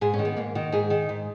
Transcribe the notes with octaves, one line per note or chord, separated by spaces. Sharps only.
G#2 G#4
C#4
D#3
B3
G#2 A#3
D#3 F#4
G#2 G#4
D#3
G#2